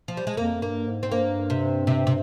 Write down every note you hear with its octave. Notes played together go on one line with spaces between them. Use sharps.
F3
G3
G#3
F2 A#3
G2 A#3
G#2
C4
G2 A#3
C3
C3
C3